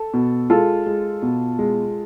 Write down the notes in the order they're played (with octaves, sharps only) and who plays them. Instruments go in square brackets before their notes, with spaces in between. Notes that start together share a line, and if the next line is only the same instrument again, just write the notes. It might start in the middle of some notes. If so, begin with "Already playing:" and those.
Already playing: [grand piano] A4
B2
G#3 F4 A4
G#3
B2
G#3